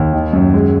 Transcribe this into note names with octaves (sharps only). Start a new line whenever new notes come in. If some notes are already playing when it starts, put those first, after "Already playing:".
Already playing: D#2
D#3
F#2
G#3